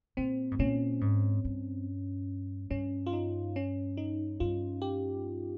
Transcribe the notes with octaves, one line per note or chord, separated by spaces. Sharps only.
A#2 C4
G#2
A#2 C#4
G#2
G2
G2 C#4
F4
D#4
C#4
D#4
G2 F4
G4